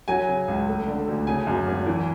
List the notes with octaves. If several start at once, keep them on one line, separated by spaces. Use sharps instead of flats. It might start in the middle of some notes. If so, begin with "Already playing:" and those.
F#3 G#5
C#3
C#2
A3
D3
D2
C#3 G#5
F#2
G#1
E3